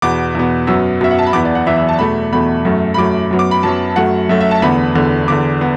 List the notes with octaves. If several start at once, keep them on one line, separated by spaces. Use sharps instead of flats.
E2 B2 B3 D6
E2 B2 B3
F#2 F#3 B3 E6
F#2 F#3 B3 E5
F#5
A5
B5
E2 E3 B3 D6
D5
F#5
E2 E3 B3 E5
E5
A5
E2 B2 A3 B5
E2 B2 A3 B5
F#2 F#3 A3
B5
F#2 F#3 A3 D6
F#2 F#3 B3
D6
B5
F#2 F#3 B3 A5
F#2 F#3 A3 F#5
F#2 F#3 A3 E5
E5
A5
E2 D3 B3 B5
E2 D3 B3
E2 D3 B3 D6
B3